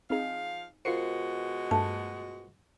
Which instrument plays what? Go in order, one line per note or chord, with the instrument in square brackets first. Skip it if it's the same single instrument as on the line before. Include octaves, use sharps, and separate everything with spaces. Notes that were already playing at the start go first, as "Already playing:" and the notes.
[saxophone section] F3 F5 [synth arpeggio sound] C4 D#4 G#4
[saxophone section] B2 G#3 F#4 [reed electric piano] F4 A#4 C5 [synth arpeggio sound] C7 C#7
[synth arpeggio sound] G2 A3 [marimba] A5